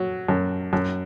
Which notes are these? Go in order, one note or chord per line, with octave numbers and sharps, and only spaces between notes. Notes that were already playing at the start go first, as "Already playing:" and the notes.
Already playing: F#3
F#2
F#2